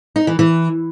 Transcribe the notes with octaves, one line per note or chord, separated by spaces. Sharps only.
D#4
E3
E3